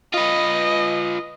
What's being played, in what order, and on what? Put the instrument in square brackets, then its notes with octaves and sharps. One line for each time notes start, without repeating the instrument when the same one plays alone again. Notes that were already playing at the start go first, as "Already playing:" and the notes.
[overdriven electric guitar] F4 B4 [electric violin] D#5